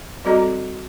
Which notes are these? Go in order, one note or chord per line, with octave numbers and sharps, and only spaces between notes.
G3 C4 F#4 A4 D#5 A#5